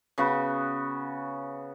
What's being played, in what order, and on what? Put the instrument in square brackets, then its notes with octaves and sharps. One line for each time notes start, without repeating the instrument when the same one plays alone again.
[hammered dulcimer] C#3 B3 F#4